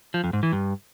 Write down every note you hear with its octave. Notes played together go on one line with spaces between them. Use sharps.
F3
F2
G#2
E3
G2